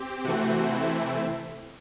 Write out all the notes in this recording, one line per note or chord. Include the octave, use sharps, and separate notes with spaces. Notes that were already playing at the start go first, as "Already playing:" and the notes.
Already playing: C4 G4
C3 E3 A3 C4 F#4
E4